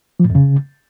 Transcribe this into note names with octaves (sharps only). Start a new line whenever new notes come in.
F3
A2
F2
C#3